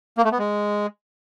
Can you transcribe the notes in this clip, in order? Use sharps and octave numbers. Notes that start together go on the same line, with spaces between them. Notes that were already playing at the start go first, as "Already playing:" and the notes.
A#3
A3
B3
G#3